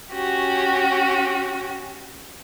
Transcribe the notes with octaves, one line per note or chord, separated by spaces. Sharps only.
C#4 F#4 G4